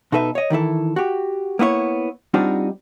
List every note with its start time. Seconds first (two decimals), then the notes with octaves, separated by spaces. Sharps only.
0.12 B2 D#4 A4 B4 E5
0.35 C#5 D#5
0.50 D#3 E3 E4 A4
0.96 F#4 G4
1.59 A#3 B3 E4 C#5
2.34 G3 C4 D4 D#4 F4 F#4